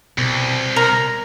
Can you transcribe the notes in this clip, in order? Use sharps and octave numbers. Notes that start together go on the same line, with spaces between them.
C2 B2
A#4 A#5